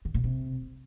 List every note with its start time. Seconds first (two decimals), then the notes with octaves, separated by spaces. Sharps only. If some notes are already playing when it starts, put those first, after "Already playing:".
0.05 D3
0.14 A#2
0.24 C3